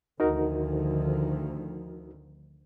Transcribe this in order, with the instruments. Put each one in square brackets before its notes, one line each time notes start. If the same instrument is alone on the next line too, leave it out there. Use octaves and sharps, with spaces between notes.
[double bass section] D2 D#3 F3 [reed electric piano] D#4 F#4 A#4